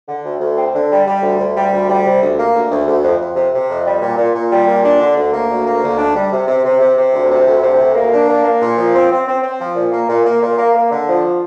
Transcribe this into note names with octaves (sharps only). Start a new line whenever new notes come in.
D3
D2
D2
C4
D3
G3
G3
D2
D2
G3
D2
G3
C3
D2
A#3
D2
D2
D2
F2
F2
C3
C3
F2
G3
A#2
A#2
A#2
G3
A#2
D4
D3
D2
A#3
D2
A#3
D2
D4
G3
C3
C3
C3
C3
C3
D2
C3
D2
C3
D2
A#3
D4
A#3
A#3
A#2
F3
C4
C4
C4
C4
F3
A#2
A#3
A#2
A#3
A#2
A#3
A#3
D3
F3